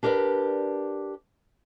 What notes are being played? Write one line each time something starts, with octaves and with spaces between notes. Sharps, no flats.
D4 G4 A#4 B4 D5